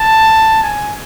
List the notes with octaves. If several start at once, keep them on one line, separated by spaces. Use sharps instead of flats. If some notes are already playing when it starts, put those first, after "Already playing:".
Already playing: A5
G#5